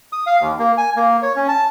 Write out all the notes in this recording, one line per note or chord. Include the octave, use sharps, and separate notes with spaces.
D#6
F5
D#2
A#3
G#5
A#3
C#5
C#4
A5